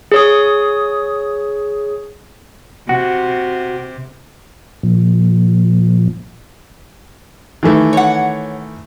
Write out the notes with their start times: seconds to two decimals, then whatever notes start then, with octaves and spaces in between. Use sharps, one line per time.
0.12 G#4 C#5 D#6
2.89 C3 F#4
4.83 A#2 F3
7.63 D#3 E3 A3
7.93 C#5 F#5